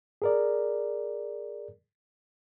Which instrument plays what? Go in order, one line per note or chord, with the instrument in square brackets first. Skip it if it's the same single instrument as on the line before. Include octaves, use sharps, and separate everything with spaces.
[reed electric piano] G#4 A#4 D5